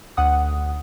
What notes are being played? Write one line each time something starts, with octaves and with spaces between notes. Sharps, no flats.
D2 F#5 D#6